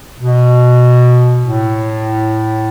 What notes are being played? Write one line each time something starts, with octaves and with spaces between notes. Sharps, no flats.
B2
A2